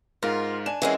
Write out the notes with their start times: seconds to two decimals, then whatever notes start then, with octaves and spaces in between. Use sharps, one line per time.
0.23 G#2 F4 A#4 F5
0.66 D4 G#5 E7
0.82 E3 G#3 C4 C#4 A#4 F#5